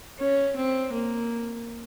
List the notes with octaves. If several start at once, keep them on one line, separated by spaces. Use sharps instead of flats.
C#4
C4
A#3